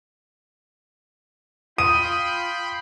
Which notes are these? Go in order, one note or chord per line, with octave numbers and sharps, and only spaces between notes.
F4 G5 B5 C6 D#6 D#7